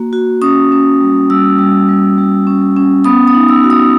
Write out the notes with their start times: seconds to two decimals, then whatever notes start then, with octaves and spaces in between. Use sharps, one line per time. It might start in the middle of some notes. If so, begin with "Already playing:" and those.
Already playing: A#3 F#4
0.13 F#4
0.42 C#4 D#6
0.72 C#4
1.01 G3
1.30 G3 E6
1.59 G3
1.89 G3
2.18 G3
2.47 C#4
2.76 C#4
3.04 B3 D#6
3.28 D#6
3.35 D#4
3.49 E6
3.64 F#4
3.70 D#6